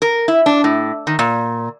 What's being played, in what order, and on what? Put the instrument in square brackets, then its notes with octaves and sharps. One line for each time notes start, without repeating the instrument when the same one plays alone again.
[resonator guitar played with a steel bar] A#4
E4
D4
A2
D#3
A#2